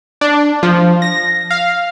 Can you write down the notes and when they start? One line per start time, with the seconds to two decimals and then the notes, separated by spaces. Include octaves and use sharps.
0.21 D4
0.63 F3
1.02 A#6
1.51 F5